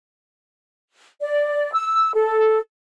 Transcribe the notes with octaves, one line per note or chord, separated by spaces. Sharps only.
D5
E6
A4